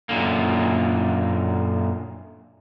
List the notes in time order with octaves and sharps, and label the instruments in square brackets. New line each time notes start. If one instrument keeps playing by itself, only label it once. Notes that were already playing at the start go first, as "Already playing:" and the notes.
[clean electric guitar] F#2 A#2 D3 A#3